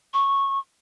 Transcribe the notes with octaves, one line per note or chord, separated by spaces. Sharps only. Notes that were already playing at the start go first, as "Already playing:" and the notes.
C#6